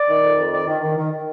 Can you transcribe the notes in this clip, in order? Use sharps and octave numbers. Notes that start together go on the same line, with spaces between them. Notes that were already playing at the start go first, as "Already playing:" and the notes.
Already playing: D5
D#3
F2
F2
D#3 D5
D#3
D#3
D#3
D#3